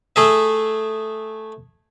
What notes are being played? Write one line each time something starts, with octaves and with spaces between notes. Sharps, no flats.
A3 G#4 E5